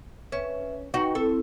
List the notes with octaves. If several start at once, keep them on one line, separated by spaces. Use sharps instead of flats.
C#4 B4 E5
D#4 F#4 B4 G5
C4 E4 A4